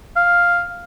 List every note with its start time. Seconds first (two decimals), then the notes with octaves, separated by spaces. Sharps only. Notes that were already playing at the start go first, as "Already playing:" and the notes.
0.16 F5